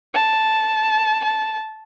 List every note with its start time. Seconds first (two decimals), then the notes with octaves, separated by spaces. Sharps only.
0.14 A5
1.24 A5